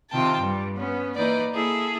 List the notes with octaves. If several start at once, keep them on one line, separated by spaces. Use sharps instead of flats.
C3 D#3 F4 G5 A5
G2 G3
B3 C#4
E3 A#3 D#4 B4 D5
A#3 E4 G#4 A4